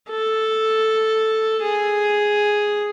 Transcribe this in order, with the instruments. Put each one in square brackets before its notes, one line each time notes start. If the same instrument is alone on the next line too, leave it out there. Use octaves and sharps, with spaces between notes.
[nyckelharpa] A4
G#4